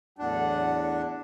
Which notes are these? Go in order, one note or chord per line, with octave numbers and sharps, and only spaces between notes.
E2 A2 F#3 D4 F#5